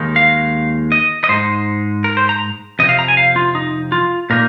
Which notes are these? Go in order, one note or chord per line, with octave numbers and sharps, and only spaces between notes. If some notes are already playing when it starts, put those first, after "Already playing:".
Already playing: D#2 D#3 G#3 D#4
F5
D#5
D#5
G#2 G#3 D#4 C5
A#4
C5
A#5
F2 C3 C4 D#5
F5
A#5
G#5
F5
F4
D#4
F4
A#2 A#3 D#4 A#4